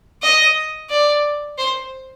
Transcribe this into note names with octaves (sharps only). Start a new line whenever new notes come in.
D#5
D5
C5